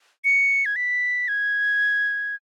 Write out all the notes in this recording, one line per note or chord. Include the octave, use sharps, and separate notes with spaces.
C#7
G#6
B6
G#6